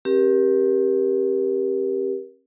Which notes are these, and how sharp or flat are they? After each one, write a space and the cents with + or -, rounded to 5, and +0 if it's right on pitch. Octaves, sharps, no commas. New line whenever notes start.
C4 +45 G4 +0 A#4 +30